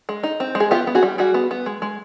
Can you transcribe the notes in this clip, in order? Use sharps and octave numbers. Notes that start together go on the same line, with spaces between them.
G#3
D#4
C4
G#3
G#4
B3 F4 G4
B3
F#4 G#4
G3
G3 F#4 G#4
B3
B3
G#3
G#3